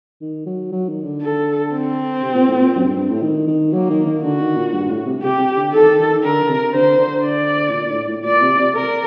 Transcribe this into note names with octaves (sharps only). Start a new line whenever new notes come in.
D#3
F#3
F#3
D#3
D3
A4
C4
C3
A#2
A2
A#2
F#2
G2
G2
A2
D#3
D#3
F#3 A#3
D#3
D#3
D3 F#4
D#3
A#2
G2
A2
C3
C3 G4
C3
D3
D#3 A4
D#3
D#3
D3 A#4
D3
C3
D3 C5
D3
D5
A2
A#2
A#2
A2
A2
A#2 D5
C3
C3
A#4